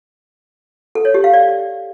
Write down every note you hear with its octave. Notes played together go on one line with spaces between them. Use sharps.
A4
C#5
G4
F5
D5